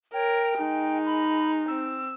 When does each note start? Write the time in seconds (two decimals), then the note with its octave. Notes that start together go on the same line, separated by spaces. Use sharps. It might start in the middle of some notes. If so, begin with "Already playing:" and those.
0.14 A#4 C#5 G5
0.59 G#3 D#4
1.06 B5
1.68 C4 E6